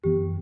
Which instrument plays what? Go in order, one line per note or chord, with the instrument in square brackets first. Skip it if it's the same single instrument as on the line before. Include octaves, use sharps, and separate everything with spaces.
[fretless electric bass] F#2 E3 B3 [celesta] G4